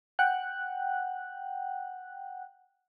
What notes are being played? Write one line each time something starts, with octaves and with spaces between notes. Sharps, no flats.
F#5 G5 F#6